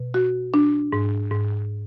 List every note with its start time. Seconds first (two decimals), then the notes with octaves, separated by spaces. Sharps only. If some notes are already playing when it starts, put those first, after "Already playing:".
Already playing: B2
0.14 F#4
0.54 D4
0.93 G#2
1.31 G#2